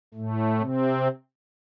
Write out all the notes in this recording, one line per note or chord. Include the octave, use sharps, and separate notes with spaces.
A2 A3
C3 C4